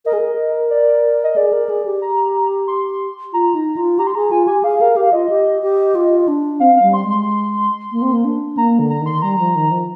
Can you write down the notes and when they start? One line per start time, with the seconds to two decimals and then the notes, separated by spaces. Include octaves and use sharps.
0.05 A#4 D#5
0.13 G#4
0.21 A#4
0.70 D5
1.24 D#5
1.36 G#4 D5
1.53 A#4
1.69 G#4
1.86 G4
2.02 A#5
2.68 C6
3.33 F4 A#5
3.55 D#4
3.77 F4
3.99 G4 A#5
4.07 C6
4.15 G#4 A#5
4.31 F4 G#5
4.47 G4 G#5
4.63 G#4 F5
4.81 A#4 F5
4.96 G4 F5
5.12 F4 D#5
5.29 G4
5.62 G4
5.95 F4
6.28 D4
6.60 C4 F5
6.76 F5
6.82 G3
6.93 C6
7.04 G#3
7.10 C6
7.92 A#3
8.02 C4
8.13 A#3
8.24 D4
8.57 A#3 A#5
8.79 D3
8.90 A#5
9.01 D#3
9.06 C6
9.22 G3 A#5
9.39 F3
9.55 D#3
9.71 F3